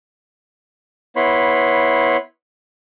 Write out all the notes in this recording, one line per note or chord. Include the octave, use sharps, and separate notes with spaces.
B3 E4 C#5 B5 C6